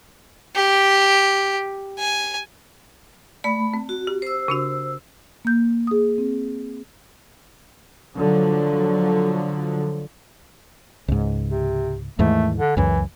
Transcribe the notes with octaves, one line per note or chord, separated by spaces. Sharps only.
G4
G#5
A3 D5 B5
C4
F#4
G4
C5 E6
C#3 D4 F#4
A#3 G6
G#4 D#6
C4
D3 F3 F#3
C#2 G#2
C3
D#2 G#2 E3 A3
D3
C#2 F#2 E3